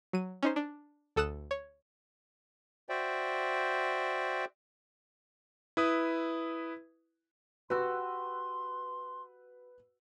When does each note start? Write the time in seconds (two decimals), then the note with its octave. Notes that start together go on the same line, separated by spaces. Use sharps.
0.13 F#3 D#7
0.43 C#4 D#4 C5
0.56 D4
1.16 D2 A4 D#6 F#6 E7
1.51 C#5
2.89 F#4 C5 D5 E5 G5
5.77 E4 B4 D#6
7.70 F#4 G4 B4 C6 E6 F#6